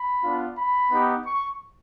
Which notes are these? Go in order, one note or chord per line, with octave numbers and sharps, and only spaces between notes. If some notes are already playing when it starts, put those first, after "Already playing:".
Already playing: B5
B3 D4 F4
B5
B3 D#4 G4
C#6